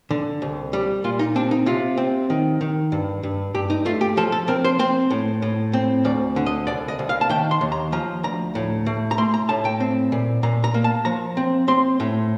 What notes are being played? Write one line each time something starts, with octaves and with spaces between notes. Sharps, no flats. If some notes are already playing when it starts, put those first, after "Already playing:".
D3
C2
G3
A#2 F4
D#4
C4 D4
D#4
C3 F4
C4
D#3
D#3
G2
G2
G2 G4
D#4
A3 F4
G4
F3 A4
A4
C4 A#4
C5
C4 C5
A2
A2
C4
D2 D5
D3
D#5
C2 D5
D#5
C2
F5
A5
D#3 G5
C6
D#2
A#5
F3 A#5
D2 A#5
A2
A3
A#5
A3 C6
A#5
A2 A5
G5
C4
A#2
A#2 A#5
A#5
A#3
A5
F3 A#5
C4
C4 C6
A2